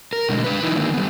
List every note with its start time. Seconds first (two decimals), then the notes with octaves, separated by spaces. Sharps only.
0.13 A#4
0.29 B2 D3 G#3 A3
0.44 D4 B4
0.63 E3 D#4 E4
0.76 D3 D#3 G#3 A#3
0.94 G3 B3